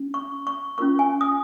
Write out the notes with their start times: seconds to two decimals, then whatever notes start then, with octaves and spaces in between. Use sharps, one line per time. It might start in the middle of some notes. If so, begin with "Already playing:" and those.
Already playing: C#4
0.14 C#6
0.47 C#6
0.78 C#4 F4 A#4 C#6
0.99 G#5
1.21 D#6